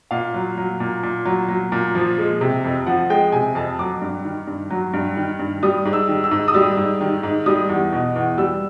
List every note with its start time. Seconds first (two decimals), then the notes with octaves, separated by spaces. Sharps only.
0.11 A#2 F5
0.34 F#3
0.58 F#3
0.80 A#2
1.03 A#2
1.26 F#3
1.48 F#3
1.72 A#2
1.95 F3
2.18 G#3
2.41 C3
2.64 F2
2.86 F3 F#5
3.10 G#3 G5
3.32 C3 G#5
3.55 F2 A5
3.79 F#3 D6
4.01 G2
4.25 D#3
4.47 G2
4.71 F#3
4.93 G2
5.17 D#3
5.39 G2
5.63 G3 D#6
5.85 G#2
5.93 E6
6.09 D#3
6.24 E6
6.31 G#2
6.48 D#6
6.54 G3 E6
6.77 G#2
7.01 D#3
7.23 G#2
7.46 G3 D#6
7.69 E2
7.92 B2
8.16 E2
8.38 G3 E6